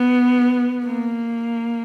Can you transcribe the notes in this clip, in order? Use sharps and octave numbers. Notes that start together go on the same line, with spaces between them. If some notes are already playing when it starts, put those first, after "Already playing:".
Already playing: B3
A#3